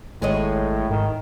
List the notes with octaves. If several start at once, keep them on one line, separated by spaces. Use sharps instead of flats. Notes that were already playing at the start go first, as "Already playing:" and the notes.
G#1 A2 G#3 C#5 D#5
G#2 D#3